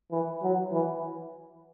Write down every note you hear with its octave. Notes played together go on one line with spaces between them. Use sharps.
E3
F#3
E3